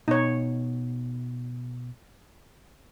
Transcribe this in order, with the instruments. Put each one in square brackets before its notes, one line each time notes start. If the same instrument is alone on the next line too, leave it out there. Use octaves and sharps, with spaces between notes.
[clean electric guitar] B2 [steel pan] D#4 C#5